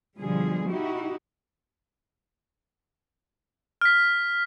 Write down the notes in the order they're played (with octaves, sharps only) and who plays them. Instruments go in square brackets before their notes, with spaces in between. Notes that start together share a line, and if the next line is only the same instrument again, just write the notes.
[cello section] B2 D3 F3 G3 G#4
D#4 E4 F#4 G4
[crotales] F6 B6